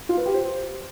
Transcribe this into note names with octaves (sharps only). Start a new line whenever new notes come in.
F4
B4
G4
C5